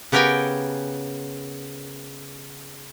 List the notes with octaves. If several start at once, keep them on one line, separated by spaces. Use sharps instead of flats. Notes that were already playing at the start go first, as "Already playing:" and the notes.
C#3 B3 G4 A#4 G5 G#5